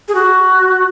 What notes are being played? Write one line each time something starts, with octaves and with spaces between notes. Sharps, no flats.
G#4
F#4